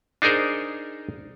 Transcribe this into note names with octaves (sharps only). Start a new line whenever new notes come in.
D4 D#4 G#4 A#4 C5